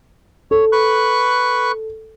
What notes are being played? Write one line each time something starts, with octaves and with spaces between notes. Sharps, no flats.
A4 C#5
B4 C#6 F#6